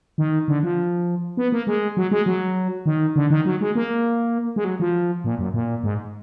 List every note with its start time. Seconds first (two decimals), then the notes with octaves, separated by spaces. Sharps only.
0.18 D#3
0.48 D3
0.63 F3
1.37 B3
1.52 A#3
1.67 G#3
1.97 F#3
2.11 G#3
2.26 F#3
2.86 D#3
3.16 D3
3.30 D#3
3.46 F#3
3.61 G#3
3.75 A#3
4.56 G#3
4.64 F#3
4.80 F3
5.25 A#2
5.39 F#2
5.54 A#2
5.83 G#2